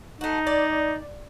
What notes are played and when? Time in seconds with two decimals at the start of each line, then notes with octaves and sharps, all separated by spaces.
0.21 A3 D#4 F#4
0.47 D5